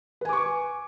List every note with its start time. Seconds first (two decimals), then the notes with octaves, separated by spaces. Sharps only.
0.21 B4
0.25 G#5
0.29 D6
0.33 C#6